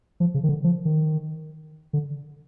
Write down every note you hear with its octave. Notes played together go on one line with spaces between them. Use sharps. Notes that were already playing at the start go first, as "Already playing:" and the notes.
F3
C#3
D#3
D3
F3
D#3
D3